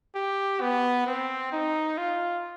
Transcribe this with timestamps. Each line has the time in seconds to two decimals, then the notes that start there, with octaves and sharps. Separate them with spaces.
0.15 G4
0.61 B3
1.07 C4
1.52 D#4
1.98 F4